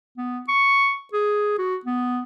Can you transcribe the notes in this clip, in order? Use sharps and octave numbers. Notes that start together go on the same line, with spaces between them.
B3
C#6
G#4
F#4
B3